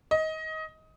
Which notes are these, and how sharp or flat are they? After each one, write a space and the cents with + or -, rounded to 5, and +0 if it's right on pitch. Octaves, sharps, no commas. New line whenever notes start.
D#5 +20